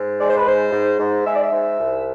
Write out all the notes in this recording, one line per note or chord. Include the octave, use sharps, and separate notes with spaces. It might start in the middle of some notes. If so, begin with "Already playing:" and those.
Already playing: G#2
G#3 D5
C5
B4
G#2 C5
G#2
G#2
G#3 E5
D5
E5
G#2
C2